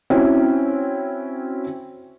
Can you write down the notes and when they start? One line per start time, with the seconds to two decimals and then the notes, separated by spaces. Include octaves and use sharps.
0.10 C4 C#4 E4 F#4